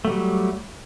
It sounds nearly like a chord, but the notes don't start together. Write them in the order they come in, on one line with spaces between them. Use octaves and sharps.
A3 F#3 G3